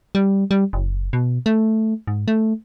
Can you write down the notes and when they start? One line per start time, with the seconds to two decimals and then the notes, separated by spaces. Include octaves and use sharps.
0.15 G3
0.51 G3
0.73 F#1
1.13 B2
1.46 A3
2.07 G#2
2.28 A3